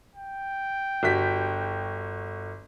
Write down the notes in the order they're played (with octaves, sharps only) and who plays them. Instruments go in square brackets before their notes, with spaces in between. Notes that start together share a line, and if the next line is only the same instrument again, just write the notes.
[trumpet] G5
[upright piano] G1 F#4 B6